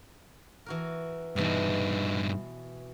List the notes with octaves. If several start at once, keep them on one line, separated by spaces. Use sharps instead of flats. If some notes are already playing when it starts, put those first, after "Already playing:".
E3 F#4 A#4
G2 B2 E3 D#4 A5